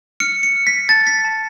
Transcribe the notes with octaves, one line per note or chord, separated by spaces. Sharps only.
F6 C#7
C#7
F6
B6
A5 A6
B6
A5